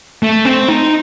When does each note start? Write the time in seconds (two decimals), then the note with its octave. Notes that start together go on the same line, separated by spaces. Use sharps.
0.23 A3
0.45 C4
0.69 D#4